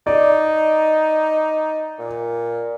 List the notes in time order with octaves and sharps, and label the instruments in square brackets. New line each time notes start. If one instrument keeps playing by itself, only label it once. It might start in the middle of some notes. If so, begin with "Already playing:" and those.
[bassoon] D#4 [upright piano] D5
[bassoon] A#2